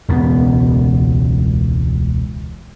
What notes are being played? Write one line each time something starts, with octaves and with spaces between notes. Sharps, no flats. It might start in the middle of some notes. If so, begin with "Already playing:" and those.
E1 C#2 B2 B3